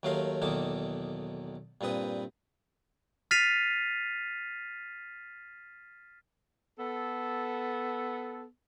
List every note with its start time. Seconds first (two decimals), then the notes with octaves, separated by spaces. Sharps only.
0.03 D#2 F#3 A3 A#4 F5 C6
0.42 B1 E2 D#3 A#3 A4 D6
1.81 G2 A#2 C4 B4 D#6
3.31 F6 A6 B6 C7 D#7 F7
6.79 B3 A4